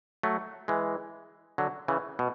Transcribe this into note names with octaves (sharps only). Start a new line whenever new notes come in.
F#3 A3
E3 G#3
D3 F#3
C#3 E3
B2